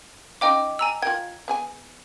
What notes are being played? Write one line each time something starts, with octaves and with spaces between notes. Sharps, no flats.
C#4 D#4 F4 D#5 G5 D6
G#5 A#5 E6
F4 A#4 G5 G#6
B3 G#4 G#5